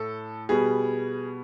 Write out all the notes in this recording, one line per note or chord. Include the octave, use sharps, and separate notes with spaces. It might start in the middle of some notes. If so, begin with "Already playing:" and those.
Already playing: A2 A4
B2 G3 B3 G#4